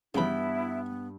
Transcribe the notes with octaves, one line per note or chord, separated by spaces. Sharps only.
G2 C#3 E3 B3 E4 G5 B5